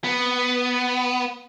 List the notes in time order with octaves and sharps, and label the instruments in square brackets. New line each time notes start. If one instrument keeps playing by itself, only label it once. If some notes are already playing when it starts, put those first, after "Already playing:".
[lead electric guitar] B3